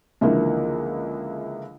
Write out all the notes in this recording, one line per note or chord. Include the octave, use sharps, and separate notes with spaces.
C#2 D3 E3 F3 A#3